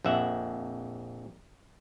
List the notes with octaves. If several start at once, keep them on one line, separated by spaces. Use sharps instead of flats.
A#1 F2 E5 F#5